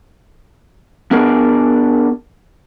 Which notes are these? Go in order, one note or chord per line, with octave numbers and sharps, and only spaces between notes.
B3 D4 G#4 A#4